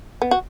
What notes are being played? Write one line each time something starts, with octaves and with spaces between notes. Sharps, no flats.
B3
F#4